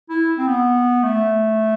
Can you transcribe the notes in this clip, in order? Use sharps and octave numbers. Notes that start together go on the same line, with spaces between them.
E4
C4
B3
A3